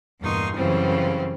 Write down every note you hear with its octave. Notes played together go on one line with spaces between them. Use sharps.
E2 G2 A#2 D#4 C6 C#6
F#2 C#3 E3 F3 G3 C4